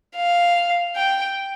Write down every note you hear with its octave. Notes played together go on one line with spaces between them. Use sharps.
F5
G5